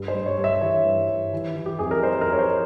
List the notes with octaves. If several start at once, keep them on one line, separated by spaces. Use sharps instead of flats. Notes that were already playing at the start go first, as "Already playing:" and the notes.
Already playing: G2
C5
G2
C#5
G2
E5
E3 C#5
G2
G2
E3
E3
G4
F2 G#4
A#4
F2 C5
A#4
F2
C#5
C5